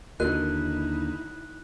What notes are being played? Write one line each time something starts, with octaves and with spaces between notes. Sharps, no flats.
D#2 D3 D#4 E4 F#4 A#4 D#5 F#6